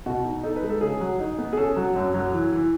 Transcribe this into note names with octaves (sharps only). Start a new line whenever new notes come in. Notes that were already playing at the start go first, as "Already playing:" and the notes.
B2 F#4
D#4
D#4 A4
B4
G#3
A4
C#3 G#4
F#3
D#4
B3
G#4
C#4 A4
F#3
F#2
F#3
E3
E3